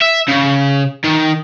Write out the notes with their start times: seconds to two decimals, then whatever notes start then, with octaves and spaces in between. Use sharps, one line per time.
0.01 E5
0.28 C#3
1.04 D#3